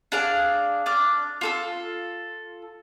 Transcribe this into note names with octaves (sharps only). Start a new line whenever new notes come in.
D4 G#4 F5 D6
D4 D6 F6
F4 A4 E6